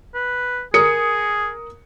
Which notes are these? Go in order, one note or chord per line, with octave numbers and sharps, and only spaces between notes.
B4
G#4 A#4 D#6 C#7